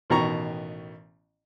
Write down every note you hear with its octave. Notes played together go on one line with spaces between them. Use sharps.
A1 B2 D#3 A#5 C#6